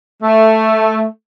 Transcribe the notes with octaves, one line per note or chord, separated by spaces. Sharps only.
A3